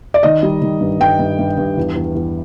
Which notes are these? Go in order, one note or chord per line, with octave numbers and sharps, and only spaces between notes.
D5
D#3 D#5
G3
D#3
G2
G2 G5
G2
G2
G2
E2
E2
E2